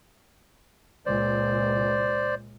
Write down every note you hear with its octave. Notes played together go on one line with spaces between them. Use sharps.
C#2 A#2 C5 D5